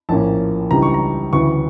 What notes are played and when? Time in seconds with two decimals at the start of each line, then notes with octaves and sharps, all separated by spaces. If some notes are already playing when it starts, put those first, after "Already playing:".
0.09 A#1 A2 F3 A#3 C#4 A5
0.70 C#2 C#3 E3 G3 D4 A#5
0.82 C#6
0.94 A#5
1.33 D2 C#3 E3 C#6